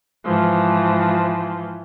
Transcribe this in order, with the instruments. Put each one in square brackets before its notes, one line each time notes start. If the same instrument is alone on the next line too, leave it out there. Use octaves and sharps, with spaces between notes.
[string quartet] G#2 E3 F3